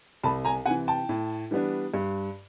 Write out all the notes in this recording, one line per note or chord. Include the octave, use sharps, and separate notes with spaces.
C2 A5 B5
G#5 A#5
C3 E3 F#5 G#5
G5 A5
A2
E3 G3 B3 D4
G2